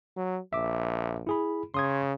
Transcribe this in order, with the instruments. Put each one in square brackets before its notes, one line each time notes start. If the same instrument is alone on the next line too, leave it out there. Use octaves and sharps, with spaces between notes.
[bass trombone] F#3
[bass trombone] A#1 [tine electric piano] E5 D6
[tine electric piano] E4 G#4 B5
[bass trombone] C#3 [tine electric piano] C6 D#6 G#6